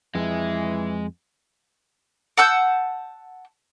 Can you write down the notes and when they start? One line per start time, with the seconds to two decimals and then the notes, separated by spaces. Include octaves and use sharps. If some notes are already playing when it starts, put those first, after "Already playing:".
0.15 F2 E3 G#3
2.37 F#5 A5 E6 G6